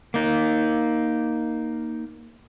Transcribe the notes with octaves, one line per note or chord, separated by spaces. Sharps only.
A#3 D#4